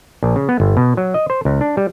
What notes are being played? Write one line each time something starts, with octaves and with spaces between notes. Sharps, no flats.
A#1
C#3
B3
G1
B2
F#3
D#5
C5
C#2
D4
G3